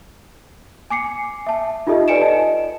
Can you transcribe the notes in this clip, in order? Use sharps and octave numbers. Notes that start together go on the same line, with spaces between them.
G#5 D6 C7 C#7
E5 A5
D#4 F4 G4 A4 D#5 E5
B4 D5 G#5 C#7 D7 E7
D#5 A5